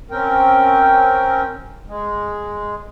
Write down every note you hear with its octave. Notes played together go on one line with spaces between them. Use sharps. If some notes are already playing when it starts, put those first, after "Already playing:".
C4 C#4 A#4 G5
G#3